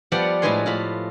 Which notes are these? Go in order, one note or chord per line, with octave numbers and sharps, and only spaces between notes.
F3 G3 B3 D5 F#5
A2 G#3 G#4 B4 G#5 C6
A2 F4 B5